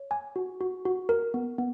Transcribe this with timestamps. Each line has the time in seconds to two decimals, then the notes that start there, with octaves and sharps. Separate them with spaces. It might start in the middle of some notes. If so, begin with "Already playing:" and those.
Already playing: C#5
0.11 G#5
0.36 F#4
0.61 F#4
0.85 F#4
1.09 A#4
1.34 B3
1.58 B3